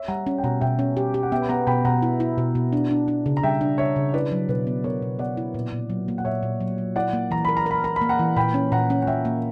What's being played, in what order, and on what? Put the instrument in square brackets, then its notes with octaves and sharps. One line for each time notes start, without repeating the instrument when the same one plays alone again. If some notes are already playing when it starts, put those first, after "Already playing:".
Already playing: [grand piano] C#5 E5
[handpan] G3 [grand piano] F#5 A#5
[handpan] C#4
[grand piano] G5
[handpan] B2 [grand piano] F#5 A#5
[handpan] B2 [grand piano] E5 G5
[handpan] C#4
G4
G4
[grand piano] F#5
[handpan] B3 [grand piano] E5 G5
[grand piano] B5
[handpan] B3 [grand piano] F#5 A#5
[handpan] B2 [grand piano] G5 B5
[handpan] B2 [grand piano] F#5 A#5
[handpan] E4
E4
B2
B2
D4
D4
D4
C#3
[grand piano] A#5
[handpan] G3 [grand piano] E5 G5
[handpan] D4
[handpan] C#3 [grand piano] C#5 E5
[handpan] C#3
[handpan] E4 [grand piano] B4 D5
[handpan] F#3
[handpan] B2 [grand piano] B4
[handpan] B3
[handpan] B3 [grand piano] A#4 C#5
[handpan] B2
[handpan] B3 [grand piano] D5 F#5
[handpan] E4
A#2
A#2
F#3
A#3
[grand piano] F#5
[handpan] A#2 [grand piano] C#5 E5
[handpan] A#2
F#3
F#3
[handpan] E4 [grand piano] D5 F#5
[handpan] A#3
[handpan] E3 [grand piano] A#5
[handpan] A#4 [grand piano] B5
[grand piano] A#5
[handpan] A#4 [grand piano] B5
[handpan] A#4 [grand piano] A#5
[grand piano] B5
[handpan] A#3
[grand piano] F#5 A#5
[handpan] E3
[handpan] A#2 [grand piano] G5 B5
[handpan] C#4
[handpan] A#2 [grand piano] F#5 A#5
[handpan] C#4
[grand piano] F#5
[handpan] A#3 [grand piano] E5 G5
[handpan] A#3